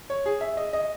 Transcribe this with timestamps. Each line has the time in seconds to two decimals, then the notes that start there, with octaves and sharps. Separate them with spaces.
0.10 C#5
0.26 G#4
0.41 E5
0.57 D#5
0.73 D#5